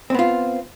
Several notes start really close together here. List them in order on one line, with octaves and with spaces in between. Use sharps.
C4 B3 F4